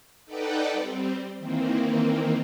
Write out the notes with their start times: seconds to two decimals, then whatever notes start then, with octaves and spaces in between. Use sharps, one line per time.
0.25 D#4 A4 B4 D5 F#5 G5
0.72 G3 C4
1.38 D#3 E3 A#3 C4